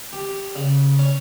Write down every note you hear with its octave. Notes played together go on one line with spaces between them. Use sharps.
G4
C#3
C#4